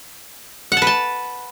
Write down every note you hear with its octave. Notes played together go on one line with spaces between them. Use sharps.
F#5
A5
B4
A5